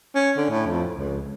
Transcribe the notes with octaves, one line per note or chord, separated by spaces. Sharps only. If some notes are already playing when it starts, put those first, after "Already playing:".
C#4
D3
A2
F2
C#2